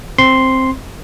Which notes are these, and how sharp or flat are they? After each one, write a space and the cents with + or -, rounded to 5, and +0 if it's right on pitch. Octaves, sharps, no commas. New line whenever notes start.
C4 +5 C6 +0